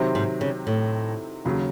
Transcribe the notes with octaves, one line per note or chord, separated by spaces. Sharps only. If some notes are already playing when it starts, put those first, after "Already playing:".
Already playing: C3 D#3 F#3 C4
G#2
C#3
A2
D#2 C#3 F#3